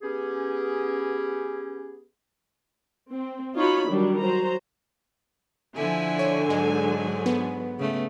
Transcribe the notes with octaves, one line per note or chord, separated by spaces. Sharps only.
B3 C#4 G4 G#4
C4
D#4 F4 F#4 C#5 B5
D#3 F#3 G3 D4
F#3 C5 A#5
D3 F3 E4 G#5
C#5
G#2 F#3 G#3
B3
C#3 A3